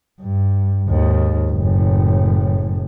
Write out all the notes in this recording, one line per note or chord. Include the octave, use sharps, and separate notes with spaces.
G2
D#2 G#2
F#1 A2